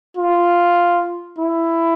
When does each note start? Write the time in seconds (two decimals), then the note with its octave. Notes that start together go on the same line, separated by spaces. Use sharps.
0.17 F4
1.39 E4